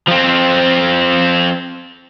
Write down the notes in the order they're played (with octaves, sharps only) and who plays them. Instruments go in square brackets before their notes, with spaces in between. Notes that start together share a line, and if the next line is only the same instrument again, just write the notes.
[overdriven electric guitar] F3 C4